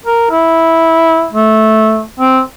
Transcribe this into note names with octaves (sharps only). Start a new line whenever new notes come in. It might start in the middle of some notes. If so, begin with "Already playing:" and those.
A#4
E4
A3
C4